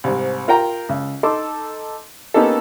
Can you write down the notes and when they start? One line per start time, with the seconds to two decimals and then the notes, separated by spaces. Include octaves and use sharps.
0.04 C2 G#2
0.48 F4 A#4 G5 A#5
0.89 C#2
1.23 D#4 A4 C6 D6
2.34 A#3 B3 C#4 D#4 G4 A4